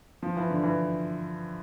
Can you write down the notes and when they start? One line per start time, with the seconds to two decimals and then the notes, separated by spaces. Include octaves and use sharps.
0.22 F3
0.36 E3
0.50 D3
0.63 E3